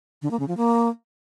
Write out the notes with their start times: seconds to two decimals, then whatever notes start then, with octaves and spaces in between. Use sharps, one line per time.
0.22 D3
0.31 A#3
0.39 C#3
0.48 F3
0.57 A#3